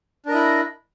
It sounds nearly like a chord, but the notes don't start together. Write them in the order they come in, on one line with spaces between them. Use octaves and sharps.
D4 A#4 D#5 E4